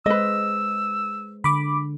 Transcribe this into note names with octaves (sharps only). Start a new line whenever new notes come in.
G#3 B4 C5 D#5 E6
D3 B5 D6